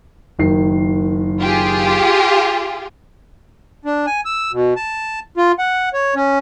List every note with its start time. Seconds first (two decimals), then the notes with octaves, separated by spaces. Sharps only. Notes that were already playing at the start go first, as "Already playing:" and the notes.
0.39 F#1 D#3 C7
1.40 F4 G4 G#4
3.85 D4
4.07 G#5
4.25 E6
4.53 B2
4.77 A5
5.37 F4
5.59 F#5
5.94 C#5
6.16 C#4